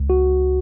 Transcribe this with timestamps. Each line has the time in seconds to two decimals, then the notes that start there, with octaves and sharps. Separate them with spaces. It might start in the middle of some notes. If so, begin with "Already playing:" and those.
Already playing: C#2
0.10 F#4